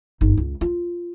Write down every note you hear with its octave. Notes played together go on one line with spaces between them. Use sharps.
G1 D#4
C#2
F4